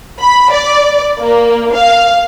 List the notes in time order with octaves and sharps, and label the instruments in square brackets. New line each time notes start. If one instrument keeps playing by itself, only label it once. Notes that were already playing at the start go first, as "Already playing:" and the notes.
[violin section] B5
D5
A#3
F5